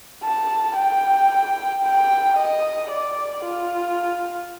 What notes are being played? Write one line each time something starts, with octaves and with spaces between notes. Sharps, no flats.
A5
G5
G5
D#5
D5
F4